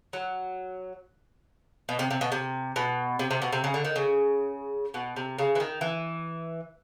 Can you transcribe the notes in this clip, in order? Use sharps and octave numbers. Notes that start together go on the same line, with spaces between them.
F#3
B2
C3
C3
B2
C3
B2
C3
C3
B2
C3
C#3
D3
D#3
C#3
B2
C3
C#3
E3
D#3
E3